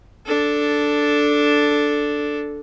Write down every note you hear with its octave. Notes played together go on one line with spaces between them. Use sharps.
D4 A4